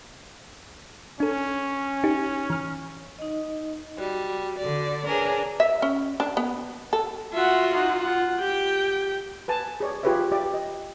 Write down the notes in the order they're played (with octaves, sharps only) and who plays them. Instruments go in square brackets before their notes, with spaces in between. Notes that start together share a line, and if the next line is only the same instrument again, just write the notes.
[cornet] C#4 [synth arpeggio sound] D4 A4
[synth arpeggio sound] D#4 G4
E3 F6
[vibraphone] D#4 D#5
[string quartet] G3 [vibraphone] F#4
[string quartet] D3 D5
[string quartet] D4 G#4 A#4 [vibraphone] B4 C#5
[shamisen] E5
C#4
D4
B3
A4
[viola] F4 F#4 [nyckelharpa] E5 F#5
[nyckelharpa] D#4 F#5
F4 F#5
[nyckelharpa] G4 [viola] G5
[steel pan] B4 G#5 A5
G#4 C#5 D5
F4 G4 G#4 B4 C#5 E5
G4 D5 E5
D#5